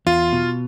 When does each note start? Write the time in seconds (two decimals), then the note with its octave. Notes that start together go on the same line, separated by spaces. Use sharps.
0.06 E2 F4
0.33 B2